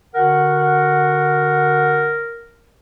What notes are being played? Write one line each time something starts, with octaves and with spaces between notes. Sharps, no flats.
D3 F#4 A#4 F#5